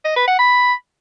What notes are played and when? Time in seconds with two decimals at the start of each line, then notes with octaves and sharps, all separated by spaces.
0.05 D#5
0.16 B4
0.27 F#5
0.39 B5